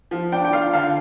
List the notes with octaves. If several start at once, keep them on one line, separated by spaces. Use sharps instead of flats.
F3
D4 G5
G5
F4 F5
D3 F5